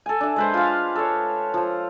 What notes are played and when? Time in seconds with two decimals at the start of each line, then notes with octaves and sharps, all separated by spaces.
0.06 A4 G#5
0.21 D4 E5
0.36 G#3 B4 C5
0.54 F4 F5
0.95 A4 C#5
1.54 F3 C5